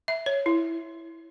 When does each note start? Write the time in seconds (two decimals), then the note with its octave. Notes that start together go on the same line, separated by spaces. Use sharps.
0.08 E5
0.26 C#5
0.46 E4